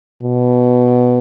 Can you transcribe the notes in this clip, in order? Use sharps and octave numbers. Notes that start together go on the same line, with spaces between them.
B2